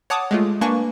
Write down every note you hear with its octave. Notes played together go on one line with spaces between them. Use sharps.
C#5 F#5 A5 D6 D#6
G#3 A3 F4
A#3 D4 B4 G#5 C#6